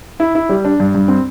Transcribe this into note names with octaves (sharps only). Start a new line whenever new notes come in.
E4
E4
G3
D4
G2
G2
C4